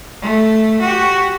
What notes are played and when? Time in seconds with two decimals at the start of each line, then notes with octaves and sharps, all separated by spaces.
0.22 A3
0.81 F#4 G4